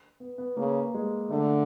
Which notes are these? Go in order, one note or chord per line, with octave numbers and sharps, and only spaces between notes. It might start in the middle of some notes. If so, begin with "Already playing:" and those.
B3
B3
C#3 A#3
G#3
D3 A3